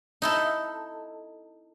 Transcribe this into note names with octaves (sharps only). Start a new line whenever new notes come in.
D#4 E4 A4